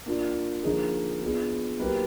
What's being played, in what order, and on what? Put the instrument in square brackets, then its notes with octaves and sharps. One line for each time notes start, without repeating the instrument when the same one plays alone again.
[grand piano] A#3 D4 F4
D3 F3 A#3 D#4 G#4
B3 D4 F4 G#4
F#3 A#3 D#4 G4 B4